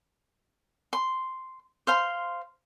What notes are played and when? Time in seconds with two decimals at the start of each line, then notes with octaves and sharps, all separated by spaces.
0.93 C6
1.87 C5 F5 C6